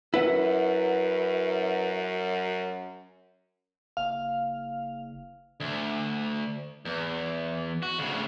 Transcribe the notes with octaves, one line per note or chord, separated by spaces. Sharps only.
F#2 E4 B4 F#5
F#1 F5
D2
E2
F#4
D2 C#3